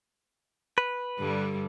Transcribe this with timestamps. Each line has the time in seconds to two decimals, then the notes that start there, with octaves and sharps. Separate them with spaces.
0.78 B4
1.19 G2 D3 G3